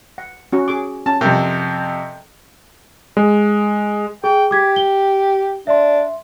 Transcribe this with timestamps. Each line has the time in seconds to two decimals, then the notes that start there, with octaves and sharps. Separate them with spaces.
0.18 F#5
0.53 C#4 F#4
0.68 G#4 D6
1.06 C#4 A5
1.21 F2 C3 A#4
3.17 G#3
4.24 G#4 G5
4.51 G4 D6 G#6 B6
4.76 G7
5.67 D4 E5 C6